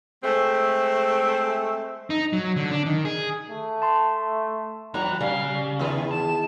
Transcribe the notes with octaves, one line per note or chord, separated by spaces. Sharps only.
G#3 A3 C4
D#4
F#3
D3
D4
D#3
G#4
A3
A5 C6
F2 E3 F#3 F#4 A#5 F#6
C#3 G3 F5
E2 D#3 F4 G#4 B5
A5 E7